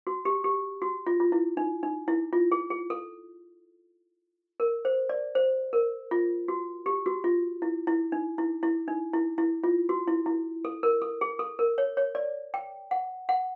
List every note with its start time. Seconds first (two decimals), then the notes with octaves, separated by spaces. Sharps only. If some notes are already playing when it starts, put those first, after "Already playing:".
0.07 F#4
0.25 G4
0.44 G4
0.82 F#4
1.06 F4
1.20 F4
1.32 E4
1.57 D#4
1.83 D#4
2.08 E4
2.33 F4
2.52 G#4
2.70 G#4
2.90 A4
4.60 A#4
4.85 C5
5.09 D5
5.35 C5
5.73 A#4
6.11 F4
6.48 F#4
6.86 G4
7.06 F#4
7.24 F4
7.62 E4
7.87 E4
8.12 D#4
8.38 E4
8.63 E4
8.88 D#4
9.13 E4
9.38 E4
9.64 F4
9.89 F#4
10.08 E4
10.26 E4
10.65 A4
10.83 A#4
11.02 A4
11.21 G#4
11.39 A4
11.59 A#4
11.78 C#5
11.97 C#5
12.15 D5
12.54 G5
12.91 F#5
13.29 F#5